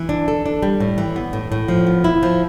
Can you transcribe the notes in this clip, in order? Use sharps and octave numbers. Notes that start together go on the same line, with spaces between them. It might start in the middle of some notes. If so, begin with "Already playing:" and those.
Already playing: E3
D4
A4
D4
G3
A2
E3
B3
A2
A2
F3
B3
E4
F3